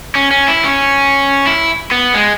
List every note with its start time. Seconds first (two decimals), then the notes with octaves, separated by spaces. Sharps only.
0.15 C#4
0.31 C#4
0.48 E4
0.65 C#4
1.47 E4
1.91 B3
2.14 G#3